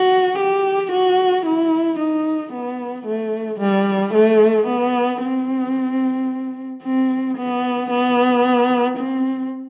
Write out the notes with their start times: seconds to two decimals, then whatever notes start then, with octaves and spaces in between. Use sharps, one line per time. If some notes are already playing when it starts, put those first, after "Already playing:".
Already playing: F#4
0.38 G4
0.92 F#4
1.45 E4
1.99 D#4
2.52 B3
3.06 A3
3.60 G3
4.14 A3
4.68 B3
5.22 C4
6.82 C4
7.36 B3
7.90 B3
8.97 C4